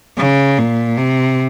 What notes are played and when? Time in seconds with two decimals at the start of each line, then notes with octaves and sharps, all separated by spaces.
0.18 C#3
0.58 A#2
0.98 C3